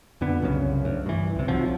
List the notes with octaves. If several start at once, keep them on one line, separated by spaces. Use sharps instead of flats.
F2 D3 B3
C2 F#2 C#3
D2
G2 E3
C#2 C3
B1 C3 F3 F#3